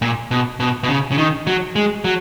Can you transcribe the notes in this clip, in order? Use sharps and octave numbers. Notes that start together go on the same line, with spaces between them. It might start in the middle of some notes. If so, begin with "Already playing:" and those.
A#2
B2
B2
B2
C#3
C#3
D#3
F#3
G#3
F#3